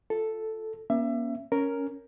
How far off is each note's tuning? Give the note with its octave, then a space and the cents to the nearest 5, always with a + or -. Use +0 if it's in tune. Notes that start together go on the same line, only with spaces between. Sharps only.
F4 +0 A4 +0
A#3 +35 C#4 +0 E5 +25
C#4 +5 A#4 +0